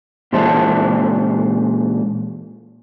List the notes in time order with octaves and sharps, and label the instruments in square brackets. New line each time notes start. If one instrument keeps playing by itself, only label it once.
[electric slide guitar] A#2 E3 G#3 C5 E5 A5